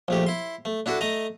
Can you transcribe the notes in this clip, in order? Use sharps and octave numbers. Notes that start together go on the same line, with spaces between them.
A#1 A3 G4
E4 C6
A3
D4 E4 F#4 A4
A3 D#5 A#5